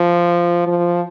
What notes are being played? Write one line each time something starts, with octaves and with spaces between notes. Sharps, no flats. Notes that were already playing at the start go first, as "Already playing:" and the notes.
Already playing: F3
F3